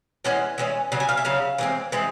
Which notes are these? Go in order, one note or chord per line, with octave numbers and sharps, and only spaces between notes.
E3 G#3 C#4 F#5
E3 G#3 C#4
C#3 F#3 F#5
G#5
F5
E5
C#3 F#3 F5
E3 G#3 C4
E3 G#3 C4